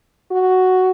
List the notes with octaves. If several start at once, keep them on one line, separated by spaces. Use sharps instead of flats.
F#4